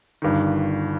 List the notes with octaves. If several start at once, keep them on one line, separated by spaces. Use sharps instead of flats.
G1 G2 D#3